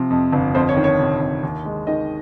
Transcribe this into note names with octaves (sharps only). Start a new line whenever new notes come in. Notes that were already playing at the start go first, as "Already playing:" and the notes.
Already playing: C3 F3
F2
G1
F2 C5
C#5
D#3
C#5
C3
F2
D#2
G#3
D#3 D#5